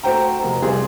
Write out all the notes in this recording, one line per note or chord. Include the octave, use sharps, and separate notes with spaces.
A3 F#4 C5 G5 A#5
F1 A#5
C2 G#4 C6